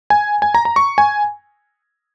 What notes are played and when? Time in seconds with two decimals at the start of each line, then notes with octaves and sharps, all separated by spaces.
0.10 G#5
0.42 G#5
0.54 A#5
0.65 A#5
0.76 C#6
0.98 G#5